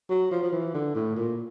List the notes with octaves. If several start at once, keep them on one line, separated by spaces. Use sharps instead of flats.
F#3
F3
F3
E3
D3
A2
A#2